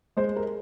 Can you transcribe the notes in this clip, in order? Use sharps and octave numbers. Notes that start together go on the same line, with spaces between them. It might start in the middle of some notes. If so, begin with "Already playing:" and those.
G#3 C5
A#4